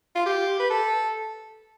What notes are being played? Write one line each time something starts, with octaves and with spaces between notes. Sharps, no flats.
F4
G4
B4
A4